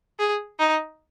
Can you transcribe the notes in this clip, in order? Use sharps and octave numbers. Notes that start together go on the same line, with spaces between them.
G#4
D#4